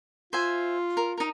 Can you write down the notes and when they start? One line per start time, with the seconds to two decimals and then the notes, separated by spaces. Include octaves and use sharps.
0.33 F4 C5 E5 G#5
0.97 A#4
1.18 D#4 A#4